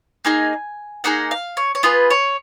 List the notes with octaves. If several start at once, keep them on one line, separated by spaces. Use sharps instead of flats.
A#3 D#4 G#4 G#5
A#3 D#4 G#4 F#5
F5
C#5
C#5
B3 F4 G#4 B4
C#5